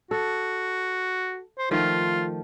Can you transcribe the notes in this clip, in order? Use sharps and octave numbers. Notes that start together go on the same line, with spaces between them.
F#4 A4
C5
D#3 F3 A3 F4